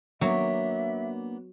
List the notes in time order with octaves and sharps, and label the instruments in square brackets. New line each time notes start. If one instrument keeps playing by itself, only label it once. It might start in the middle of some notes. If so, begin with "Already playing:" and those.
[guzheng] F#3 [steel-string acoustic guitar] A#3 B3 D4 [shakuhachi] E5